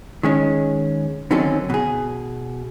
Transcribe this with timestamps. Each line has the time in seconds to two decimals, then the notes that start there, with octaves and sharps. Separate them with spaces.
0.23 D#3 G#3 C#4
1.31 D3 D#3 F#3 C4 C#4 A4
1.70 B2 G#4